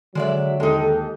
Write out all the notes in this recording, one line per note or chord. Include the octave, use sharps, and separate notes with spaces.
D3 F#3 G#3 D5 E5
D#2 G#3 D#4 G4 A4